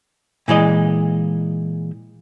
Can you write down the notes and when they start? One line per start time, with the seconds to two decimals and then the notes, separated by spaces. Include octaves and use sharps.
0.48 A#2 E3 G#3 D#5